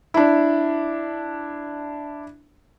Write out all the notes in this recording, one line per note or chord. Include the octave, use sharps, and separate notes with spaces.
D4 E4